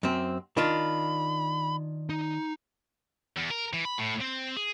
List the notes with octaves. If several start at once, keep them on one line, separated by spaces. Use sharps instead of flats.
F#2 C4
D#3 D4 F4 B5
D#4
E2
A#4
E3
B5
A2
C4
G#4